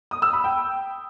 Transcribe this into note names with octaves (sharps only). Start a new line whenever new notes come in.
D#6
E6
B5
G5